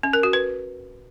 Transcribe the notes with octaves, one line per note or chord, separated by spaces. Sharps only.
C#4
A#4
F#4
B4